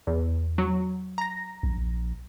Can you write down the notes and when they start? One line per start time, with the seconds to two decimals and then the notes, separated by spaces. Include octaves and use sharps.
0.07 E2
0.58 F#3
1.18 A#5 A#6
1.63 A#1